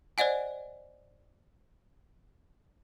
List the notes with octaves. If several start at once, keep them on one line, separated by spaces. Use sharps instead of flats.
C5 D5 D#5 F#5 G#5